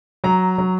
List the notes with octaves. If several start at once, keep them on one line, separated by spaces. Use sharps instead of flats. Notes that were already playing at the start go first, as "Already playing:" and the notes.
F#3 A#5
F#3